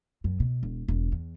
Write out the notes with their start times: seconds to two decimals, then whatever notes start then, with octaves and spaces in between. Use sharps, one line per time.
0.24 F#2
0.40 B2
0.63 E1
0.88 E1
1.12 E2